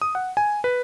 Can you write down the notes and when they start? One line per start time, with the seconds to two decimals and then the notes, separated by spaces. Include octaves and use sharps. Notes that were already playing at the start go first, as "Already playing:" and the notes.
0.02 D#6
0.15 F#5
0.37 G#5
0.64 B4